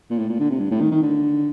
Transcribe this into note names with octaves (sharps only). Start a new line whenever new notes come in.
A#2
A2
A#2
D3
C3
G2
A2
D#3
D#3
D3